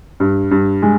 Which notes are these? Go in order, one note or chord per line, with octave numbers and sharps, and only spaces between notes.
G2
G2
G#3